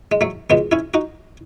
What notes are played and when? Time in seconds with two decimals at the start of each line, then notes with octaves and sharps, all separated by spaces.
0.12 G#3
0.21 F#3 A3
0.50 C#2 B2 G#3 B3
0.72 C#4 E4
0.94 D#4 F#4